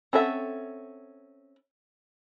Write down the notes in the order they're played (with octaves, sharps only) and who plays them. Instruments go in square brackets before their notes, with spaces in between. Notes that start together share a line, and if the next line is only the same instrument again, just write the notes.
[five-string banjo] C4 C#4 A4 E5 F#5